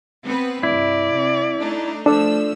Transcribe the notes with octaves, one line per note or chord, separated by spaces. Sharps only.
B3 C4 B4
C2 G2 E4 D5
C3
A3 D4 D#4
F3 A3 D4 A4 D5 E6